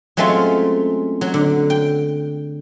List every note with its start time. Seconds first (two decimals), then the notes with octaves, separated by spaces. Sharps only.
0.17 F#3 G#3 A3 C4 C#4 F4
1.21 F#3
1.34 D3
1.70 G5